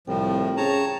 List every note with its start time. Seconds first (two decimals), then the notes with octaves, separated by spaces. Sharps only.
0.07 C2 A2 F3 G5
0.57 C#3 C#5 A5 A#5